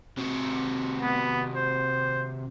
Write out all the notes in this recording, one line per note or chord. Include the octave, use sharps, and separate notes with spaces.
C3 F#4
B3
C5